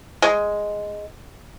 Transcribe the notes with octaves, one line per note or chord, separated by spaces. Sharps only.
G#3